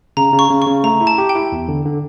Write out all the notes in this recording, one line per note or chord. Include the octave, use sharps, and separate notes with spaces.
C#3 A#5
C#3
C#6
C#3
C#6
C#3
A3 A#5
E4
A5
G4
G5
E4
E2
D3
D3